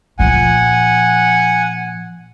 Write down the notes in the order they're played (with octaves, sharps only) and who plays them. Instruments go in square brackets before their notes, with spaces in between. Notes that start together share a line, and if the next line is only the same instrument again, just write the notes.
[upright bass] A#2 F3 [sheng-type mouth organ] F#5 G#5